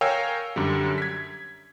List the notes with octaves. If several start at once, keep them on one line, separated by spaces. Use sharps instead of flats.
A#4 C#5 F5 G5 G#5 E6
F#2 D3 G3
G#6 B6